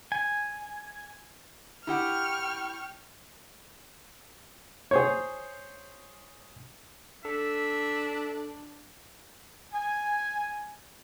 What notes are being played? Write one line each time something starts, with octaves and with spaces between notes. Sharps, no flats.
G#5
E4 G4 F#5 G5 C#6 F6
G#4 C5 C#5
D4 A4 E5
G#5